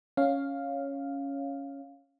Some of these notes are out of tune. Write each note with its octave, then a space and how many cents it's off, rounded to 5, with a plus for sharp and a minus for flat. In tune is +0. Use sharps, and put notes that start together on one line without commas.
C#4 +0 C#5 +5 F5 +0